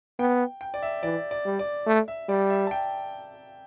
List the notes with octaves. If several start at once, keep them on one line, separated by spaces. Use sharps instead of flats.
B3 G5
G5
D5
E5
E3 D5
D5
G3
D5
A3
E5
G3 D5
E5
A5
G5